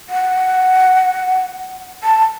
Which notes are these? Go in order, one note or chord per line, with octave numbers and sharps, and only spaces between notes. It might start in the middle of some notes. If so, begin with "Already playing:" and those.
F#5
A5